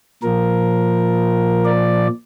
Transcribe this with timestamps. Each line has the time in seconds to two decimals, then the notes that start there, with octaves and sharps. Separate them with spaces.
0.23 A#2 F3 A#4
1.65 D5